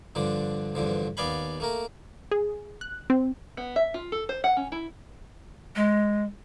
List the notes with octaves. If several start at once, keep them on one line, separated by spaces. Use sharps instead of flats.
G2 D3 F3 D4
E2 G2 D3 F3
D#2 B3 D5 F5 G#5 B5
A3 A#3 A#4
G#4
F#6
C4
B3
E5
F4
A4
C5
F#5
C#4
E4
G#3